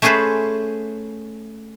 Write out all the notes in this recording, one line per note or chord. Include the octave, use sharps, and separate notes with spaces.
A3 C#4 G#4 A4 B4 C5